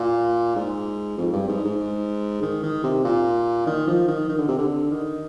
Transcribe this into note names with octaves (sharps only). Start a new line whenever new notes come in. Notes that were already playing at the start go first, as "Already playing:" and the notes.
Already playing: A#2
G#2
F2
G2
G#2
G#2
D#3
D#3
C3
A#2
D#3
F3
D#3
D#3
D3
C3
D3
D#3